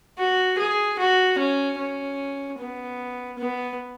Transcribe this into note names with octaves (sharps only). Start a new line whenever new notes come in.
F#4
G#4
F#4
C#4
C#4
B3
B3